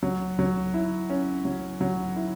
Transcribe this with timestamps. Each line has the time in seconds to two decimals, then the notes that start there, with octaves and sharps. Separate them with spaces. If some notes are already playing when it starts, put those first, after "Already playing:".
0.03 F#3
0.39 F#3
0.74 E4
1.10 C#4
1.45 F#3
1.81 F#3
2.16 E4